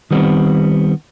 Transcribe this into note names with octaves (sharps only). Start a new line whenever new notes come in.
D#3 G3 B3 C4